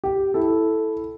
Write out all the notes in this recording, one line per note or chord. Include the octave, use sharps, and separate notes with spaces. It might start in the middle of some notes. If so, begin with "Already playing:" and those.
G4
E4 A4